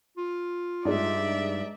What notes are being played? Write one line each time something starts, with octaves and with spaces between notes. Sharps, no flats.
F4
G2 G#3 D4 D#4 D5 E5